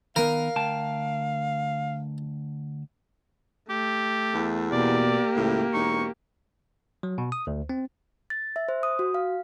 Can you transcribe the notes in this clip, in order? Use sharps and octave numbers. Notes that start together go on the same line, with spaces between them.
D#3 B3 A#4 F5
D2 G5 A5
A3 G4
E2
B2 A#3 G4 D5
C#2 A2
E1 D#4 C#6
F#3
B2
D#6
D2
C4
A6
E5
C5
D#6
F#4
F5